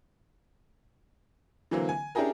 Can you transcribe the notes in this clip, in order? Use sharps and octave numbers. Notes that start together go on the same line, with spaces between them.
D3 E3 F#3 A#3 C4
G#5
C#4 D4 E4 G4 G#4 A#4